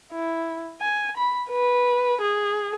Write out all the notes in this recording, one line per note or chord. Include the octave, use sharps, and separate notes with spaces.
E4
G#5
B5
B4
G#4